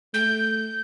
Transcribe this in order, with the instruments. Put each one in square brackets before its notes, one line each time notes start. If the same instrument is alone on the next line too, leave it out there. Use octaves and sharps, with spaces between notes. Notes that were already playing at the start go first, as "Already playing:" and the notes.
[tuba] A3 [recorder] G6